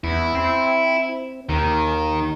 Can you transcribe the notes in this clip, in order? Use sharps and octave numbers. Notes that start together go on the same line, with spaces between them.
E2 E4
C4
D#2 D#3